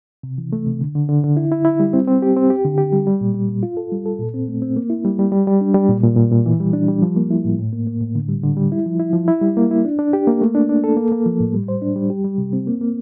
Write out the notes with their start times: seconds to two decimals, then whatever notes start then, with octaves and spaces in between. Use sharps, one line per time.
0.23 C3
0.38 E3
0.53 A3
0.67 C3
0.81 D3
0.95 D3
1.09 D3
1.24 D3
1.37 E4
1.52 E4
1.65 E4
1.80 G3
1.93 C4
2.07 C4
2.22 G4
2.37 C4
2.50 G4
2.65 D3
2.78 G4
2.92 G3
3.07 G3
3.21 A#2
3.35 G3
3.48 A#2
3.63 F4
3.77 A4
3.92 G3
4.06 A4
4.19 A#2
4.34 C4
4.48 A3
4.62 C4
4.77 A#3
4.90 E4
5.05 G3
5.19 G3
5.32 G3
5.47 G3
5.61 D4
5.74 G3
5.89 A#2
6.03 A#2
6.17 A#2
6.31 A#2
6.46 E3
6.60 G3
6.73 D4
6.88 G3
7.02 F3
7.16 A#3
7.31 E4
7.45 A2
7.59 A2
7.73 A#3
7.87 A#3
8.01 A2
8.15 D3
8.29 G3
8.43 D3
8.57 G3
8.72 E4
8.86 F3
9.00 E4
9.13 F3
9.28 E4
9.42 G3
9.57 A#3
9.71 E4
9.85 D4
9.99 D4
10.13 G4
10.27 A#3
10.42 A3
10.54 D4
10.69 D4
10.84 A4
10.97 A#3
11.12 A#3
11.26 F3
11.40 A2
11.54 G3
11.68 C5
11.82 D4
11.96 G3
12.10 G4
12.25 G3
12.38 C3
12.53 C4
12.67 A#3
12.81 A#3